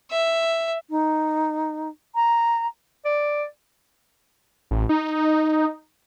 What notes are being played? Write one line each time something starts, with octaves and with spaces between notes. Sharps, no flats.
E5
D#4
A#5
D5
A1
D#4